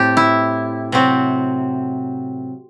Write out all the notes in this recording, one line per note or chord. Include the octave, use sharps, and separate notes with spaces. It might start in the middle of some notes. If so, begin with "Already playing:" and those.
Already playing: A2 C4 G4 A4
E4
C3 F#3 C4